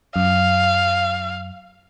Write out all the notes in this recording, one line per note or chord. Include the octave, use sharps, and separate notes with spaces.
F#2 F5